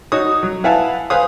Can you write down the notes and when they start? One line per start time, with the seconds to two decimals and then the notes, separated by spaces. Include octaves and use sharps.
0.12 D#4 F#4 C#5 D#6
0.43 F#3
0.64 E4 B4 F5 F#5 G#5 A5
1.10 B4 C5 F5 G#5 D#6